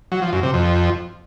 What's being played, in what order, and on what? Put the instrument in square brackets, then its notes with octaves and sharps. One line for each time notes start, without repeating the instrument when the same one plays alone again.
[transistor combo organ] F#3
F3
F#2
C3
F2